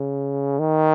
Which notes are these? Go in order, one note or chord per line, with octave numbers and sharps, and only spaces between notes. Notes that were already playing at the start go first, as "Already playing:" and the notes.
Already playing: C#3
D#3